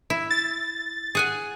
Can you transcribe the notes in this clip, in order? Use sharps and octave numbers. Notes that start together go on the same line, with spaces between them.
E4
A6
G#4 F#5 G#5